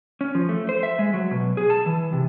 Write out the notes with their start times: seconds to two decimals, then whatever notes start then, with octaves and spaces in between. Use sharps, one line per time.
0.21 C#4
0.35 F3
0.49 A3
0.69 C5
0.83 E5
0.99 G#3
1.14 F#3
1.31 B2
1.57 G#4
1.70 A5
1.86 E3
2.13 C3